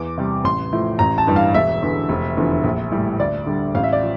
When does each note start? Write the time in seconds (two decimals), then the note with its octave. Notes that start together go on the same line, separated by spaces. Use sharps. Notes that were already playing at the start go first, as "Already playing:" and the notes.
Already playing: E2 D6
0.18 C3 G3
0.44 A1 C6
0.73 A2 F3
0.99 A1 A#5
1.18 A5
1.27 G2 E3 G3
1.36 F5
1.54 E1 E5
1.82 E2 D3
2.09 F1
2.37 E2 D3 F3
2.64 A#1
2.91 A2 G3
3.19 D2 D5
3.46 D3 G3
3.75 A1 F5
3.84 E5
3.93 D5
4.02 F3